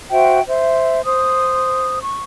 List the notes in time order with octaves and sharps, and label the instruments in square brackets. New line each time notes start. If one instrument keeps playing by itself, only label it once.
[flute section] F#4 C5 E5 G5
C5 E5
C5 D#6
C#6